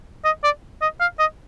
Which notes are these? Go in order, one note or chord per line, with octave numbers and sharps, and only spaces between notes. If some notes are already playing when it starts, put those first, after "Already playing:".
D#5
D5
D#5
F5
D#5